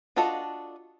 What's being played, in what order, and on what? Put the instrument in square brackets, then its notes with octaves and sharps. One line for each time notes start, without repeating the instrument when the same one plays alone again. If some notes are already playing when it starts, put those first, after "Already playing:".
[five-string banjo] D4 F4 F#4 A4 D#5